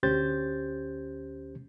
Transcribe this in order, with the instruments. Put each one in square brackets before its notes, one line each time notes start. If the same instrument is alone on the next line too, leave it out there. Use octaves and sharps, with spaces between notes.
[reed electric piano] D2 C#4 G4 C5 G6 A6